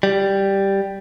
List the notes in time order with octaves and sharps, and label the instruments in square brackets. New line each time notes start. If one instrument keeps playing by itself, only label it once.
[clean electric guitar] G3